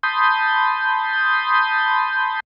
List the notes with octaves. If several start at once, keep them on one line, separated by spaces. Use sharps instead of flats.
A5 B5 C6 D#6 G6